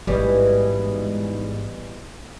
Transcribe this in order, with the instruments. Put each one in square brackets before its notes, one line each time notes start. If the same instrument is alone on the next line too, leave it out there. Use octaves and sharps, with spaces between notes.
[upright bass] A1 [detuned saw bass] G#2 [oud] B2 E3 G3